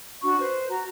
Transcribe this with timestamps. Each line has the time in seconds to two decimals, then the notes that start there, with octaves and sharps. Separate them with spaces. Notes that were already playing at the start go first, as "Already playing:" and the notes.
0.22 D4 F#4 C#6
0.39 B4 C5
0.69 F#4 A#5